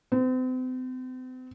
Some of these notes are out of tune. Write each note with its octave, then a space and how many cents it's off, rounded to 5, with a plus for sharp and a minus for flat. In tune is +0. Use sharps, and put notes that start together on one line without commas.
C4 -40